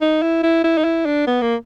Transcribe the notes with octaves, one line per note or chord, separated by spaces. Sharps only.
D#4
E4
E4
E4
D#4
E4
D4
B3
A#3